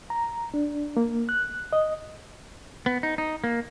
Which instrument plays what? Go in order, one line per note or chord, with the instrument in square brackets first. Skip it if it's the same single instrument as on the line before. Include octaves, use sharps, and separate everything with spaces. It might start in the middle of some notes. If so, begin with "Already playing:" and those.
[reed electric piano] A#5
D4
A#3
F#6
D#5
[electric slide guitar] B3
D#4
D#4
A#3